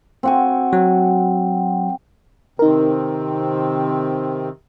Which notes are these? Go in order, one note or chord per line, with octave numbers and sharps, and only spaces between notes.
C4 F#4 G#5
F#3
C3 D#3 C4 D#4 A#4